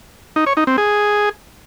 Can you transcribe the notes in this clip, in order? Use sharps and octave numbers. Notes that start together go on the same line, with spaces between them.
D#4
C#5
D#4
C4
G#4